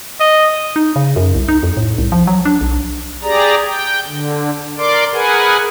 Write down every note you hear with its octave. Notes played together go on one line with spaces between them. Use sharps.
D#5
D#4
C#3
F#2
C2
D#4
F2
A2
C2
F3
F#3
D4
B1
G4 G#4 D5 A#5
G5
D3
A#4 D5 C6 D6
G#4 A#4 B4 F#5 G#5